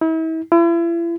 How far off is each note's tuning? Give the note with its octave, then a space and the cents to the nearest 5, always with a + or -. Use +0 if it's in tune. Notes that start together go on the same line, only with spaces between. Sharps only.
E4 -40
E4 +40